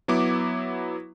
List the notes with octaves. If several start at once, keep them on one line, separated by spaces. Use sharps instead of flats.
F#3 B3 E4 D6